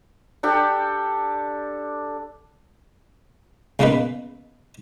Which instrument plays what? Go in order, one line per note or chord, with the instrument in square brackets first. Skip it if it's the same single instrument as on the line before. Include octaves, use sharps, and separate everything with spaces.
[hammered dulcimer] D4 G4 A4 G5
[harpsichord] C#2 C#3 A#3 B3 D#4 B4